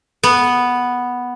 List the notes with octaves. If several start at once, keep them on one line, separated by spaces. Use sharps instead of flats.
B3